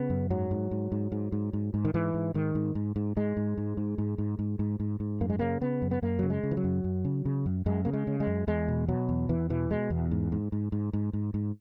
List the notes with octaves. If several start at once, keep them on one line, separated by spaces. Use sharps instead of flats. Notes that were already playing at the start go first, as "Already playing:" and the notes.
Already playing: C#3 B3
F#2
G#2 F#3
G#2
G#2
G#2
G#2
G#2
G#2
G#2
D#3
G#2 E3
G#2
G#2 D#3
G#2
G#2
G#2
G#2 G#3
G#2
G#2
G#2
G#2
G#2
G#2
G#2
G#2
G#2
F#2 A#3
G#3
C#3 A#3
C#3 B3
F#2
B3
F#2 A#3
C#3 F#3
G#3
C#3
E3
F#3
F#2
F#2
C#3
C#3
F#2
F#2 G#3
C#3 A#3
G#3
C#3
G#3
F#2
E2 G#3
B2
B2 F#3
E2
E2 E3
B2 E3
B2 G#3
E2
G#2
G#2
G#2
G#2
G#2
G#2
G#2